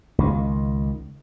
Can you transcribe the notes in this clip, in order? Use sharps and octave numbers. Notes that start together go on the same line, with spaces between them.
C#2 D#3